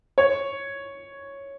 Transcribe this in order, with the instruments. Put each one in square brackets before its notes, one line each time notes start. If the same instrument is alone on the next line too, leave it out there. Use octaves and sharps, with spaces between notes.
[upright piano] C#5